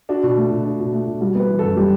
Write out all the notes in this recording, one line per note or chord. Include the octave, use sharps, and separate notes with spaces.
D4 F#4
B2
A3
B2
D4
B2
A3
B2
G3 F#4
B3 B4
E3
F#2 A4
G3 G4